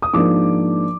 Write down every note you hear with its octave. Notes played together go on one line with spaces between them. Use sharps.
D#6
G#2 F3 A#3 D4 D6